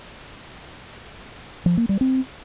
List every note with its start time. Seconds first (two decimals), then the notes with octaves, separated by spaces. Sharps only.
1.66 F3
1.77 A#3
1.89 G3
2.01 C4